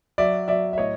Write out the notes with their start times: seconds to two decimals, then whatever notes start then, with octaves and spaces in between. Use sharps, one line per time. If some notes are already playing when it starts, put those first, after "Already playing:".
0.18 F#3 D5 E5
0.48 F#3 D5 E5
0.73 E5
0.78 A2 C#5 D#5